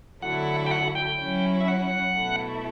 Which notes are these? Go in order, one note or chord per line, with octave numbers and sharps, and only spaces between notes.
D3 F#3 A3 E4 F#5
G5
F#5
G5
F#3 C#4 E4
E5
F#5
B2 A3 E4